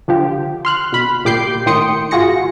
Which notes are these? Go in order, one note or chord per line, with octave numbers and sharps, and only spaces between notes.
D3 F3 G4
C6 F6 F#6
B2 B5
G#1 A#2 G4 D6 G6 C7
A2 D#3 G5 C6 D#6 C#7
G#1 F4 F#4 G#4 A#6 C#7